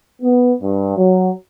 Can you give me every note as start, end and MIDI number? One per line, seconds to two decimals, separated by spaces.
0.22 0.53 59
0.61 0.95 43
0.97 1.30 54